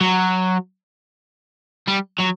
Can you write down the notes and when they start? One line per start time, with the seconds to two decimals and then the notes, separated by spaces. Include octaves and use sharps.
0.01 F#3
1.88 G3
2.19 F#3